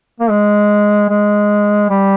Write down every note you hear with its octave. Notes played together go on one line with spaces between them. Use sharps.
A#3
G#3
G#3
G3